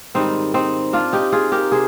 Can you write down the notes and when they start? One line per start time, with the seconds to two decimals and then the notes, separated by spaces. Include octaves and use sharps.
0.14 G#2 D#3 G3 C4 D#4
0.54 C4 D#4
0.93 D4 F4
1.13 D#4 G4
1.32 F4 G#4
1.52 G4 A#4
1.71 C3 G#4 C5